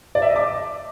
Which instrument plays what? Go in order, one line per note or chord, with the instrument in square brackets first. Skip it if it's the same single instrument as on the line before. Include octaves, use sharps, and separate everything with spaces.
[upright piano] D5
E5
D#5
D6